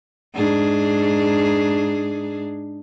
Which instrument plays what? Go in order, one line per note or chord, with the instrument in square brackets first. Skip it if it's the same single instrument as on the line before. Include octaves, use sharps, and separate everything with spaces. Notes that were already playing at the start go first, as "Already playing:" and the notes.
[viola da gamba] G#2 D4 G#4